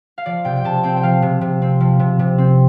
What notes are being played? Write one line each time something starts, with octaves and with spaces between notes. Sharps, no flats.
F5
F3 D5
C3 G5
G5
C3 A5
C4 G5
G5
F3 F5
C3
C3
C4
F3
C3
C3
C4